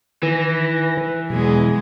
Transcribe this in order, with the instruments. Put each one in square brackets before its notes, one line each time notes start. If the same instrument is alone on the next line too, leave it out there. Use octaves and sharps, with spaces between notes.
[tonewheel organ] D#3 B4 A#6 [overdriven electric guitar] E3
[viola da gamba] E2 G#3 G#4 [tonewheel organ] B2 F#3